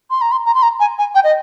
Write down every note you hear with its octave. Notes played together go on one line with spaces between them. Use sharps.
C6
A#5
C6
A#5
C6
A#5
G#5
G#5
G5
D#5